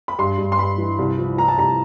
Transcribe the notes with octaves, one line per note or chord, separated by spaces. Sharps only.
B5
G2 C6
G2
C6
G2 B5
E3
C2
F3
F3 A#5
A5
C2 A#5